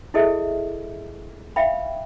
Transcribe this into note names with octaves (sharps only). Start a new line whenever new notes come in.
E4 G#4 A4 D#5 E5
E5 F5 G5 B5